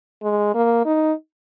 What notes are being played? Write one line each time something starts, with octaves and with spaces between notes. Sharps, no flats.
G#3
A#3
D#4